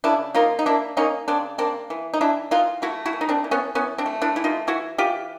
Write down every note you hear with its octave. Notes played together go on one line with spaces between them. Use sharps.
C#3 D4 E4
A#3 D#4 F4
D#4
A#3 D4 E4
A#3 C#4 D#4
C#3 C4 D4
A#3 C4 D4
E3
D#4
E3 D4 E4
E3 D#4 F4
A3 E4 F#4
E4 F#4
E3
D#4
C4 D4
E3
B3 C#4
E3 B3 C#4
C4 D4
A3
D4 E4
E3 E4
D#4 F4
E3 E4 F#4
E3 F4 G4